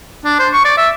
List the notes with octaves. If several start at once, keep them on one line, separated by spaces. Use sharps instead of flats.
D4
C5
C#6
D5
E5